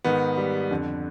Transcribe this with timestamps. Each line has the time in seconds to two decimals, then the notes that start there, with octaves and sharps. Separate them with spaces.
0.04 G#2 D#3 B3
0.37 G3
0.71 F2 D3